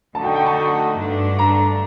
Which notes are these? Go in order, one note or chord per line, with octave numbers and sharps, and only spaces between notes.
D3 A3 D#4 F#4 A5
G5
G5
A5
G2 D3 A3 D4
A#5